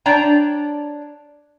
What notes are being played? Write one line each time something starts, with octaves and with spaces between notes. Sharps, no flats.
D4 C#5 D5 G5 A#5